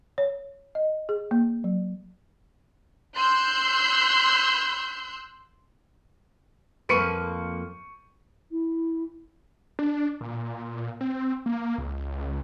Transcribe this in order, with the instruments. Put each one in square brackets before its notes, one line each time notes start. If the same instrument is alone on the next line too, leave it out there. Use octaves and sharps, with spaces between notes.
[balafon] C#5
D#5
G#4
A#3
F#3
[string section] C6 E6 F#6 G6
[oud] F2 A#3 B4 [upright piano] C#6 C#7 D#7
[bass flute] E4
[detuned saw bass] D4
A#2
C4
A#3
C#2